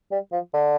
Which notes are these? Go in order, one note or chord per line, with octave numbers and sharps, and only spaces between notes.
G3
F3
D3